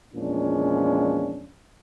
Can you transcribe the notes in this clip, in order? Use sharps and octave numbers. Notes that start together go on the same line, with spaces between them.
E2 A#2 F3 G#3 C#4 D4